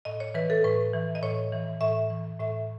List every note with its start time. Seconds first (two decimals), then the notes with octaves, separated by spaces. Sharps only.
0.05 A2 D#5
0.20 C#5
0.34 E3 B4
0.50 A4
0.64 A2 B4
0.94 E3
1.15 D#5
1.23 A2 C#5
1.52 E3
1.81 A2 E5
2.10 E3
2.40 A2 E5